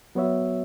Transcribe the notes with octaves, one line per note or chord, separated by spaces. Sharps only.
F#3 B3 F#4 C#5 E5